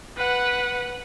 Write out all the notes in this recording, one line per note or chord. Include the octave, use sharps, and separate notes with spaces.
B4 F#5